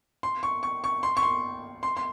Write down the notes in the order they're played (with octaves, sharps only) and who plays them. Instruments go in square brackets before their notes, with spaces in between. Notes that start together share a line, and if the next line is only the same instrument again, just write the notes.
[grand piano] C6
C#6
C#6
C#6
C6
C#6
C6
C6
C6